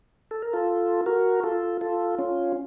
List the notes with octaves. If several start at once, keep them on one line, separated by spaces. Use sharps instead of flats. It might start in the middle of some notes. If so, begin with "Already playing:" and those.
A4
A#4
F4 A4
F#4 A#4
F4 A4
F4 A4
C#4 F4